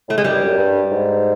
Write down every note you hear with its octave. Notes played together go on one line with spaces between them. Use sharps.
A2 A3
G#3
F#2 G3
G2
F#2
G2
G#2